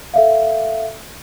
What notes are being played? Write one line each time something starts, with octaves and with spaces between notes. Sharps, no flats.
A4 E5 F5